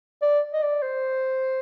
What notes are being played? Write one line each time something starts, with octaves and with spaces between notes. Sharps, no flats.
D5
D#5
D5
C5